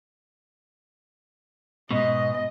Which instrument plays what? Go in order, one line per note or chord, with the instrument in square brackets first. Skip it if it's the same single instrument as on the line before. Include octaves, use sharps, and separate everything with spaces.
[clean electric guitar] G#2 B2 [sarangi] D#5